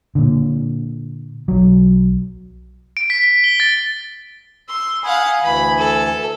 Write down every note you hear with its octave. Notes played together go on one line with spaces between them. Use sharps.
A#2 D3
B1 F#3
D7
B6
B6
G7
A6
C6 E6
F5 F#5 G#5 B5 D#6
D2 E3 G#5 B5
A4